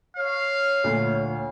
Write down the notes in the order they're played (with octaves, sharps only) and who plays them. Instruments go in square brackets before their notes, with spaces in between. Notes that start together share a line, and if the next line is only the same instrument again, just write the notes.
[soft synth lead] C#5 [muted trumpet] F5
[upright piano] D2 A#2